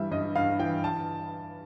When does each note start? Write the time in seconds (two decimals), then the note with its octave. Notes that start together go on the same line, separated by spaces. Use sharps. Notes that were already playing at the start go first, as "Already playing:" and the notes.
Already playing: G2 E3 G3 E5
0.11 G2 D#5
0.35 G2 F5
0.59 E3 G5
0.84 A5